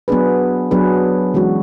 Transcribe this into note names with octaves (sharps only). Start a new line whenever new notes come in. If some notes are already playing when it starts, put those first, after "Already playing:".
F#3 B3 D4 G#4 B4
F#3 B3 D4 G#4 B4
E3 G#3 C#4 F#4